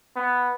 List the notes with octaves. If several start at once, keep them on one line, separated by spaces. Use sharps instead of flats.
B3